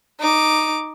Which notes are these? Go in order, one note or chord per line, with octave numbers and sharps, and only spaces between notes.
D#4 D6